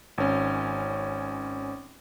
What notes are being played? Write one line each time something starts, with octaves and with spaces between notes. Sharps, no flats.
G#1 C#4